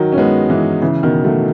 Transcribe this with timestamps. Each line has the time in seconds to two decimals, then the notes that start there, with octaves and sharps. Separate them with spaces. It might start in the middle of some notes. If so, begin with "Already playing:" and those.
Already playing: D#3 F#3
0.12 C#4
0.18 G#3 B3
0.50 E3 G#3
0.81 C#3 E3
1.03 B2 D#3
1.24 F#3 A3